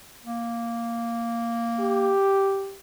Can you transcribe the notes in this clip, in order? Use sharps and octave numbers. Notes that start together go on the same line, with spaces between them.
A#3
G4